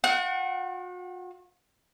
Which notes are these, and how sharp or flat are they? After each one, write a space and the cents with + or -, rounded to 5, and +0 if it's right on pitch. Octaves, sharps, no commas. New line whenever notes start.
F#4 -45 F#5 +35